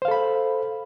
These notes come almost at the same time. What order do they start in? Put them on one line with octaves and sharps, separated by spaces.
C5 F5 A4 B5